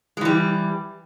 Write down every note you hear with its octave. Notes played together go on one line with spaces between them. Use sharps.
E3 G3 G#3